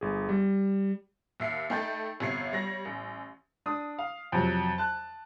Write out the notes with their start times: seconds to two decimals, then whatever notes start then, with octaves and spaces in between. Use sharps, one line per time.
0.01 G1 G#4
0.29 G3
1.40 D#2 E5 C7
1.70 A3 D#4 G5 B5 G6 A6
2.20 G1 C3 C#5 C7
2.52 G3 C#5 A#6
2.85 A1
3.66 D4 D#6
3.98 F5
4.32 F2 C3 F#3
4.78 A5 F#6